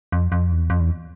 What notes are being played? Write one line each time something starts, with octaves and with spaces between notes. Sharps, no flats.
F2
F2
E2
F2
E2